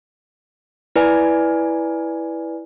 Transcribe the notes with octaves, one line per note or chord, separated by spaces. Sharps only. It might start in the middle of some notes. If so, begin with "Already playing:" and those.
E4 B4 D5 G#5